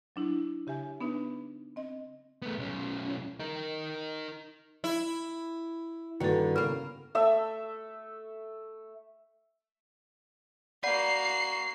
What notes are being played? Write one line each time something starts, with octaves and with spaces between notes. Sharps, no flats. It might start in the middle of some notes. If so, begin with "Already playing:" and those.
F#3 D4 E4
C#3 G4 E5 G#5
B3 D4 D#4 B4
C4 D#5
A3 B3
B1 C#4
D#4 A#4
E4
G2 D3 D#3 A#3 F#4 A4
C#3 B3 C#4 A#4 F5
A3 E5 E6
A#3 F#4 D5 F#5 B5 C7